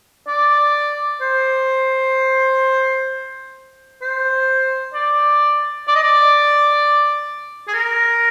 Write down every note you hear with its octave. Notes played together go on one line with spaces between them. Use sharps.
D5
C5
C5
D5
D5
D#5
D5
G#4
A#4